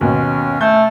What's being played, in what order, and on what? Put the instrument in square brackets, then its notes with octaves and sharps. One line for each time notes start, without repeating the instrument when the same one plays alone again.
[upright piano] D#2 B2 [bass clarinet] C#4
[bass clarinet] A3 [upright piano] G6